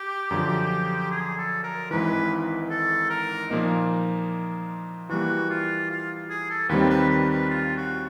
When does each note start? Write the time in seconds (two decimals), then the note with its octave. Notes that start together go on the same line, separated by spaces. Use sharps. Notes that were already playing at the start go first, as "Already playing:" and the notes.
Already playing: G4
0.31 F#2 D3 F3
1.11 G#4
1.38 A4
1.63 A#4
1.91 G#1 G#2 E3 B4
2.70 A4
3.10 A#4
3.50 A#2 F3 A#3 D#4
5.09 E3 G3 A#3 F#4
5.50 F4
5.91 F4
6.30 G#4
6.50 A4
6.69 D#2 D#3 G3 C4 B4
6.90 B4
7.10 B4
7.30 B4
7.50 F4
7.77 F#4